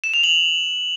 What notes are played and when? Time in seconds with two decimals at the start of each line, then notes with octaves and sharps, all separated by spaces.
0.04 E7
0.14 F7
0.24 F#7